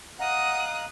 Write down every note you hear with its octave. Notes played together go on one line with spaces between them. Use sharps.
D#5 F5 F#5 A#5 D#6 F#6